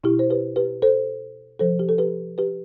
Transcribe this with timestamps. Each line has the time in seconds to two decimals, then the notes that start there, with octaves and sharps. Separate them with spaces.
0.04 B2 E4 G4
0.19 C5
0.30 G4 B4
0.56 G4 B4
0.82 A4 C5
1.59 C3 F3 A4 C5
1.79 G4
1.89 A4
1.98 G4 B4
2.38 G4 B4